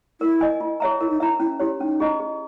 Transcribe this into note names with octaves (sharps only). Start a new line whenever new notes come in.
E4 A#4
D#5 G#5
E4
G#4 C#5 E5 A#5
E4 A#4
D#4
E4 E5 A#5
C#4 E4
E4 G4 C#5
C#4 D#4
E4 G#4 D#5 A#5
G#4